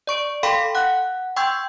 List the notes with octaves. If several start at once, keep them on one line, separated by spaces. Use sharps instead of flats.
D5 C#6 D7
A4 F5 G5 B5 C6 B6
F#5 F#6
G5 C6 C#6 E6 G6 G#6